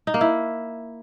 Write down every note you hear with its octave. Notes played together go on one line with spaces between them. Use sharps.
D#4
A#3
E4